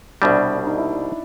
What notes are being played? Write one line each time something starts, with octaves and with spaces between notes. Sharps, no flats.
C2 B2 G3 D4
D4
D#4
E4